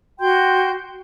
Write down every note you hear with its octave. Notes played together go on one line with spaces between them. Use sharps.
F#4 G5 C6 G6